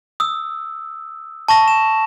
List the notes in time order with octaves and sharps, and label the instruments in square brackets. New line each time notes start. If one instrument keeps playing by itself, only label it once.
[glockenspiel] D#6 E6
A5 C#6 A#6
E7